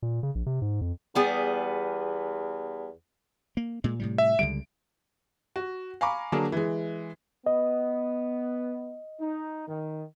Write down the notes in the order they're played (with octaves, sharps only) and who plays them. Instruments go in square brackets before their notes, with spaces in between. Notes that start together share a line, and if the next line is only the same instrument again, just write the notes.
[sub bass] A#2
C#3
A#1
C3
G#2
F2
[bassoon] E2 [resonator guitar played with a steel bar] G3 B3 G#4
[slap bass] A#3
A#2 G#3
A2 C3 G3
[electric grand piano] E5
[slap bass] C#2 D3 G3 [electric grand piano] D7
[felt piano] F#4
F5 G#5 A#5 B5 C#6 D6
D3 F#3 A#3 D4 G#4 A#4
E3 G#3
[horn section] B3 [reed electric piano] D#5
[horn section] D#4
D#3